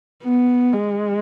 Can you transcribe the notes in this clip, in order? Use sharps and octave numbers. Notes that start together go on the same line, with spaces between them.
B3
G#3